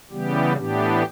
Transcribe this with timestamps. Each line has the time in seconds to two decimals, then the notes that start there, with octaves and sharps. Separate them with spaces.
0.11 C#3 E3 G3 B3 G4
0.57 A2 E3 B3 D4 G4